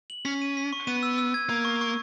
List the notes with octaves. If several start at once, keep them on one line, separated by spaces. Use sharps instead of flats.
F#7
C#4 B6
D#7
B6
C#6
B3 D#7
E6
E6
G#6
A#3 G#6
C#6
C#6